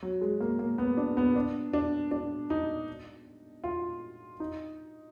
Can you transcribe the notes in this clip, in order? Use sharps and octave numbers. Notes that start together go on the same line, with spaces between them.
F#3
G#3
A#3
A#3
B3
D4
B3
D4
D4
D4
D#4
F4
D#4